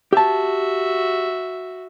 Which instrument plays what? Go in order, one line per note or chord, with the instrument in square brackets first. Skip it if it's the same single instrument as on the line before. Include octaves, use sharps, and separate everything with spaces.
[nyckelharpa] F#4 E5 [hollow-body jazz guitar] G4 A5